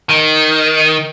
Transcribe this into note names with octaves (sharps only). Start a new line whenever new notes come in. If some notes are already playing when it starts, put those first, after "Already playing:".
D#3